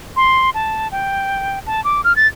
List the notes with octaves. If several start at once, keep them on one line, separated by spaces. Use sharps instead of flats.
C6
A5
G5
A5
D6
F6
A6